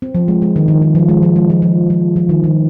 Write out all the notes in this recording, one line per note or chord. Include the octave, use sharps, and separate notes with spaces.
C4
F3
G#3
G#3
D#3
D#3
D#3
F3
G#3
F3
G#3
F3
F3
F3
F3
D#3
D#3